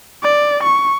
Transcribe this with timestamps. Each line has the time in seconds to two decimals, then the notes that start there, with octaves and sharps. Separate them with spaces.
0.23 D5
0.63 C#6